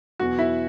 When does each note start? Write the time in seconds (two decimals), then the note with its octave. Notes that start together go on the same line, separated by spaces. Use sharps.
0.20 E2 B2 F#3 F#4
0.38 E4